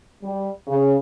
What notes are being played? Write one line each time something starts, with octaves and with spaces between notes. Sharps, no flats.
G3
C#3